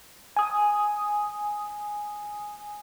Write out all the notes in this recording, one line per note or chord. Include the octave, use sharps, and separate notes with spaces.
G#5 D#6